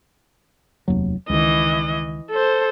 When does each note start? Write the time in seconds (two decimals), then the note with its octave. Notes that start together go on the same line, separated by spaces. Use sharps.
0.88 F1 D#2 F#3
1.30 C#2 D#3 E3 D#5
2.31 A4 C5